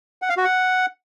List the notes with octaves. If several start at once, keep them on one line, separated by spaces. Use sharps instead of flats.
F#5
F5
F#4
F#5